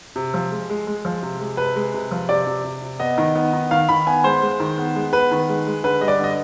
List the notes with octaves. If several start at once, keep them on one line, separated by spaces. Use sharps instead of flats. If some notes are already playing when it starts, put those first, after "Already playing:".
C3
F3
G#3
G#3
G#3
F3
C3
G#3
C3 B4
G#3
C3
F3
C3 D5
C3
C3
C3
B3 D#5
D#3
B3
D#3
D#3 F5
D#3 B5
B3 G#5
G#3 C5
G#3
D#3
B3
G#3
B3 B4
D#3
G#3
G#3
D3 B4
G3 D#5
D5
D3 D#5